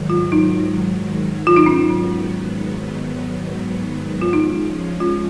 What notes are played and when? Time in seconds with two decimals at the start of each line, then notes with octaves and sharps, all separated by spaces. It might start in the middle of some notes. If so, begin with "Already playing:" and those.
Already playing: G#2 D#3 F#3
0.10 F4
0.32 D#4
1.47 F4
1.56 D#4
1.66 G#2 D#3 F#3 B3 C#4
4.22 F4
4.33 F3 G#3 C#4 D#4
5.00 F4